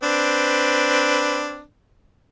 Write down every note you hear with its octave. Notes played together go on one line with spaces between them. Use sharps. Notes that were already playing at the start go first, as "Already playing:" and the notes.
C4 D4 B4